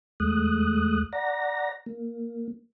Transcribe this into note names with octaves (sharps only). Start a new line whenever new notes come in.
E2 G#3 A3 D#6 F#6
D5 F#5 A#5 A#6
A#3